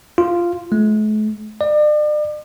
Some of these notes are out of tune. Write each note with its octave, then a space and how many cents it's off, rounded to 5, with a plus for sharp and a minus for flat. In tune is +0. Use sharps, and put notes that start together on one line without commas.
F4 -5
A3 -45
D5 +40